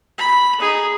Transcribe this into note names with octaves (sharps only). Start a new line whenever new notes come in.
B5
D#4 G#4